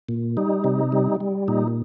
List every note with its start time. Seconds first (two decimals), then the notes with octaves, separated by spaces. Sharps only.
0.09 A#2
0.37 G3 D#4
0.64 C3
0.92 G3
1.20 G3
1.48 A#2 D#4